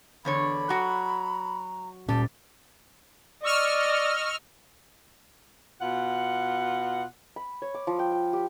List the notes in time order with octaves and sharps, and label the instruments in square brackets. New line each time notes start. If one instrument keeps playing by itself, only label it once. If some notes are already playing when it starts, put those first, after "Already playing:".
[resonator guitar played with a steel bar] E2 D3 C#5 [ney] B5
[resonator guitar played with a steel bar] F#3 F#4 [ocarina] A#5
[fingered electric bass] A#2 C#4 [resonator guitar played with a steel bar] G3 [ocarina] A5
[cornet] D5 [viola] D#5 [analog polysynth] C#6 E6 F6
[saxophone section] B2 F4 F#5
[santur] B5
C#5
D6
F3
G5
G5
G4